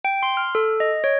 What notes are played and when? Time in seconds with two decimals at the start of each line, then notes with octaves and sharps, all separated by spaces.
0.05 G5
0.23 C6
0.37 F6
0.55 A4
0.80 D#5
1.04 C#5